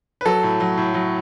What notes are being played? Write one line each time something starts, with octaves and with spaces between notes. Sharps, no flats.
B4
F#3 A4
A2
F#3
A2
F#3